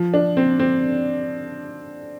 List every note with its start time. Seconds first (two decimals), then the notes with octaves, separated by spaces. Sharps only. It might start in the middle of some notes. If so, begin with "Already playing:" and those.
Already playing: F3
0.14 D4
0.37 C4
0.59 C4